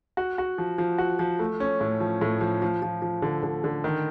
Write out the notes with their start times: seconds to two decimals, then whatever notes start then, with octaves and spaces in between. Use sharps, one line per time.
0.17 F#4
0.38 F#4
0.58 F3
0.78 F3
0.98 F#4
1.19 F3
1.39 A3
1.60 C#4
1.81 A2
2.00 F3
2.22 A2
2.41 F3
2.62 F3
2.82 F3
3.02 F3
3.22 D3
3.43 D3
3.64 D3
3.84 D#3